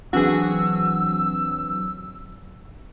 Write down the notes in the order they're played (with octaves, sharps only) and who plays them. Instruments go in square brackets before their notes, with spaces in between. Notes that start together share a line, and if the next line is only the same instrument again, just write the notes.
[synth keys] E3 C4 D4 [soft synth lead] F#3 [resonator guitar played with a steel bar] F#4 G#4 [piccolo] E6